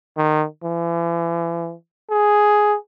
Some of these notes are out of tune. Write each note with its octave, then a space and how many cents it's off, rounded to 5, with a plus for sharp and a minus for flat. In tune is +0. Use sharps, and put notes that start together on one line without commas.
D#3 -20
E3 +40
G#4 +5